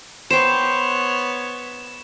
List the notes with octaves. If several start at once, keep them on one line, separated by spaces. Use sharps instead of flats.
B3 C5 C#5 G5 E7